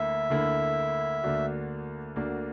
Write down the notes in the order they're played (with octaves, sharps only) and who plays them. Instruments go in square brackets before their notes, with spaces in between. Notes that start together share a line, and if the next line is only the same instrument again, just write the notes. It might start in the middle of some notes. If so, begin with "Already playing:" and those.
Already playing: [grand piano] D2 D3 A#3 E4 [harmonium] E5
[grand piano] D2 D3 A#3 E4
D2 D3 A#3 D4 F#4
D2 D3 A#3 D4 F#4